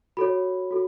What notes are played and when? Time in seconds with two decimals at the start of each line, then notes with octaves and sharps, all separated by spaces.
0.17 F#4 A4 C#5 B5
0.71 F#4 A4